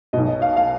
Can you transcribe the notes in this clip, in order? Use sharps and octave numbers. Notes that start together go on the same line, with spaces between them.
B1 B2 D#5
D#5
F5
F5